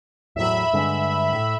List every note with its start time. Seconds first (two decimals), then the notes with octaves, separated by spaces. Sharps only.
0.36 E2 A2 F#3 E5 B5
0.73 G2 D3 G#3
1.32 A2